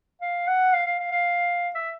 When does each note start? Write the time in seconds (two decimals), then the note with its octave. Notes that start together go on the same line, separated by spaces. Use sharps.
0.21 F5
0.47 F#5
0.74 F5
0.86 F5
0.99 F5
1.11 F5
1.75 E5